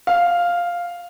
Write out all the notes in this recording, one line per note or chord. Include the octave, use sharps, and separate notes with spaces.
F5